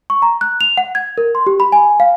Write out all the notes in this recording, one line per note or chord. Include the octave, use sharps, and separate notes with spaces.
C#6
A#5
F#6
F7
F#5
G#6
A#4
C6
G4
B5
G#5
F5